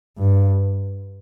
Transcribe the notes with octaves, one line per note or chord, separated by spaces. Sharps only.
G2